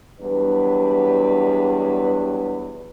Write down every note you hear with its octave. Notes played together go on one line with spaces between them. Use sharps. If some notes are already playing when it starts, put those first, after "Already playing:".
E2 F#3 G3 D4 B4